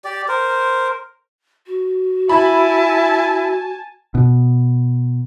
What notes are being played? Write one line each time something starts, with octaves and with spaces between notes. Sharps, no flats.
G4 D5
A#4 C5
F#4
E4 G#5 A5 B5
B2